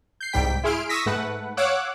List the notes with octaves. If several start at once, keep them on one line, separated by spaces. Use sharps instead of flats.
G6 C7
C2 G#2 G3 G5 B6
E4 G#4 C6 F6 D7
C#6 D#6 E6 A#6 B6
G#2 A3 B4 F#5
C#5 F5 F#5 D6 E6 F#6